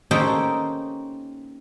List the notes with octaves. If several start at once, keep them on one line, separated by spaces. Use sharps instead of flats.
A#3 C#4 D#4 G4 A4 C5